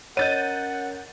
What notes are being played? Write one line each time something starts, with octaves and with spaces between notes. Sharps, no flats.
C#4 A#4 C#5 D#5 F#5 G6 A6 D#7